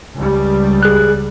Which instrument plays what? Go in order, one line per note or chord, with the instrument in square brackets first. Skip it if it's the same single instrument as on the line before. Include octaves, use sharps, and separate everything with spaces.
[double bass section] C#2 G3
[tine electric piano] G#4 F#6